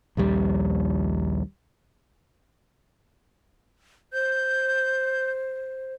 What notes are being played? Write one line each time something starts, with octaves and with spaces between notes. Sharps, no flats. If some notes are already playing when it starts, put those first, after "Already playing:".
A#1 D#2 G3
C5 G6